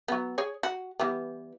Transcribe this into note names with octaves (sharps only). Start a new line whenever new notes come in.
F#3 B3
G#4 C#5
F#4
E3 G3 B3